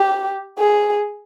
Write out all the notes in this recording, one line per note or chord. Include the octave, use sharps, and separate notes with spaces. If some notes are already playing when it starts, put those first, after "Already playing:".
Already playing: G4
G#4